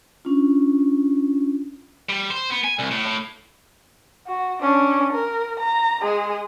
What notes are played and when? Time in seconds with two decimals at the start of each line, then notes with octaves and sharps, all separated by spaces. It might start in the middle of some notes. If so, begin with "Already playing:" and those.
0.25 C#4 D4 F4
2.09 G3
2.30 C5
2.50 B3
2.64 G#5
2.79 C2
2.91 A2
3.06 A2
4.27 F#4
4.62 C#4 D4
5.13 A#4
5.60 A#5
6.03 G#3 G#4